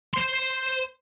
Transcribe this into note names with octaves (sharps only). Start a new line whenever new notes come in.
C5 C6